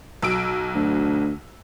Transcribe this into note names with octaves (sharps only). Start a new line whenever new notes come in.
B1 E6 D7
D2